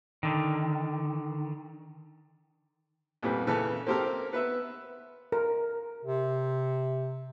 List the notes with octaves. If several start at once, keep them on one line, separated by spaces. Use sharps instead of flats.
D3 D#3
F2 A#2 G3 B3
A#2 C#3 E3 A4 B4 A5
A#3 C4 G4 A4 A#4
B3 B4 E5 E6
A#4
C3